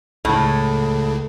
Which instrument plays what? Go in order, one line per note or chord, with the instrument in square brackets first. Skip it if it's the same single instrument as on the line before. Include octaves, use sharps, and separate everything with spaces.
[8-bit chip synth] C#2 C#3 [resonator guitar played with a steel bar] A2